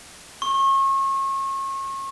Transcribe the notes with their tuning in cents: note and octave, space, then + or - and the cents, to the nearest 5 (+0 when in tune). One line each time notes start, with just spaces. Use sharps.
C#6 -35